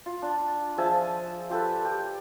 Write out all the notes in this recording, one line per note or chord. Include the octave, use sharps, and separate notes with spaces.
F4
D4
F3 G#4 E5 A5
F4 G4 A4 B4
G4